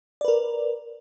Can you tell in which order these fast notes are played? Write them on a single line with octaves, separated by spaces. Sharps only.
D5 B4 A#4